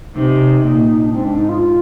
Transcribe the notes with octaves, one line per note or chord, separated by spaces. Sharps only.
C3 D#4
A#2
D4
G#2 C4
D4
D#4
F4